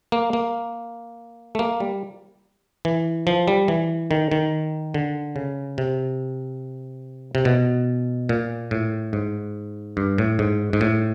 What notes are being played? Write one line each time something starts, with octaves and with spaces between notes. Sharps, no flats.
A#3
A#3
A3
A#3
G3
E3
F3
G3
E3
D#3
D#3
D3
C#3
C3
C3
B2
A#2
A2
G#2
G2
A2
G#2
G#2
A2